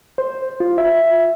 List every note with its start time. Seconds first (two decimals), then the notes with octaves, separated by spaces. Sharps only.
0.18 C5
0.60 F4
0.78 E5